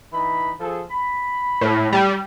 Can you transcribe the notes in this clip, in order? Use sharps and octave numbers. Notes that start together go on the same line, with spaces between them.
E3 D#4 B5
F3 G#4 A4
B5
A2
G3